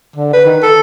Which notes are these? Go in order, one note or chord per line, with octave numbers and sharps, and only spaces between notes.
D3
B4
D#3
A4